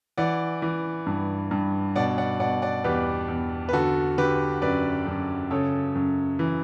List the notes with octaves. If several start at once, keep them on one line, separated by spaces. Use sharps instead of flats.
E3 D5 F#5
E3
G2
G2
B2 D5 F#5
D5 F#5
B2 D5 F#5
D5 F#5
E2 G4 B4
E2
B4
D3 F#4 A4
D3 G4 B4
F#2 B4 D5
F#2
C#3 A4 C#5
F#2
E3